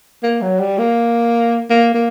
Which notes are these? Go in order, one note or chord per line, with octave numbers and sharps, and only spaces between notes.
A#3
F#3
G3
A#3
A#3
A#3